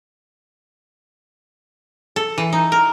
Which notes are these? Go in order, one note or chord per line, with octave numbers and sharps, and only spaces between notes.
A4
E3
D#4
A#4